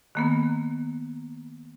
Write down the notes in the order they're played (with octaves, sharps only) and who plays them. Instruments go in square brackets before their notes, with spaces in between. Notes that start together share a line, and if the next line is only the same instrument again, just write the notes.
[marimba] D#3 A#3 B3